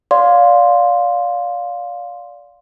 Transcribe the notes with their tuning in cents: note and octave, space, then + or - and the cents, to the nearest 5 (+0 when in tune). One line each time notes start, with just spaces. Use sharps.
D5 -20 F5 +15 C6 +0